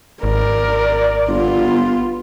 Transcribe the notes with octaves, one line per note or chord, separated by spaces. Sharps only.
G#1 A#4 D5
G1 B3 F4